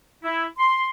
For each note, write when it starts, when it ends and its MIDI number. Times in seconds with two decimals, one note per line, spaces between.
0.24 0.45 64
0.58 0.90 84